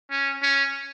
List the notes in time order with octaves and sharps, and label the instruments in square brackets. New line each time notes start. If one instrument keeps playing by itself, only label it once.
[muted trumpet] C#4
C#4